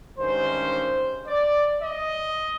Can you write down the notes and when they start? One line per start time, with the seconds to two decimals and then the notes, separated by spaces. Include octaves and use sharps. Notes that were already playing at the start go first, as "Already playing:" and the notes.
0.18 G2 D#3 G#3 C#4 C5
1.26 D5
1.81 D#5